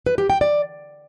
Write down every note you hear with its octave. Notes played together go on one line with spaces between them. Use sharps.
B4
G4
G5
D5